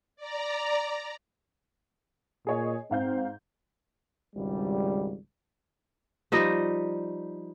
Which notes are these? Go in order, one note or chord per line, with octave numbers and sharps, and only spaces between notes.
D5 A#5
A#2 G#4 C#5 D#5
G#2 C4 F5 G6
G#1 C#2 G3
F3 G3 D#4 D#5